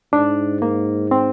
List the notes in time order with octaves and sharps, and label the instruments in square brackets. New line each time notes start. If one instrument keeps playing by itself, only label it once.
[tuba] G#2 [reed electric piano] D4
[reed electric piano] A#3
C4